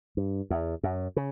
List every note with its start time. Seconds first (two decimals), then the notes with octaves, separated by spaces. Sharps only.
0.17 G2
0.50 E2
0.83 F#2
1.16 C#3